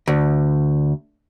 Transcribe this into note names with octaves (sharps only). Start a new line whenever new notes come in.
D2